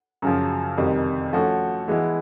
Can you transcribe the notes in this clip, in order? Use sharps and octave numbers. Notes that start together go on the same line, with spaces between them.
F#2 C#3 F3
F2 C3 D#3 G3
F3 A3 C#4 F#4
E3 G#3 B3 E4